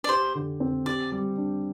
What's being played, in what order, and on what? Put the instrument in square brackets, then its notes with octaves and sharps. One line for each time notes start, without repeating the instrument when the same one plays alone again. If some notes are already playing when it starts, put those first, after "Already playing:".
[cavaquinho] D5
[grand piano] G4 [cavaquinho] C5
[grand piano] D3
C4
[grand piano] G4 [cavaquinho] D5
[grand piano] G3
D4